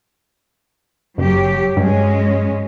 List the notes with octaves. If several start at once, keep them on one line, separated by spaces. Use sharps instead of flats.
F#1 F#3 G4
G2 F#3 G#3 C#4